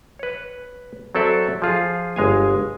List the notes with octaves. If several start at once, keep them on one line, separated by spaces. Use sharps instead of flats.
B4 C#5
F#3 C4 A4 D5 E5
F3 F4 G#4
G1 G#3 F5 G#5